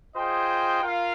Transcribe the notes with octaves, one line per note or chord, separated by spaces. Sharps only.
F4 G#4 C5 D#5 G5
F4 A#4 F5